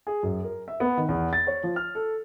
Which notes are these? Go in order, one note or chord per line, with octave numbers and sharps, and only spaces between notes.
G#4
F#2
A#4
E5
B3
D#3
E2
A6
C#5
F3
F6
A4